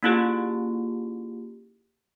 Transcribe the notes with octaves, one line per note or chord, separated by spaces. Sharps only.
A#3 C#4 E4 F4 G4 G#4